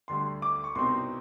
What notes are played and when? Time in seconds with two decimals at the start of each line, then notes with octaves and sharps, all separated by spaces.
0.08 D2 D3 G3 C6
0.42 D6
0.64 C#6
0.75 C2 B2 G3 C4 D#4 C6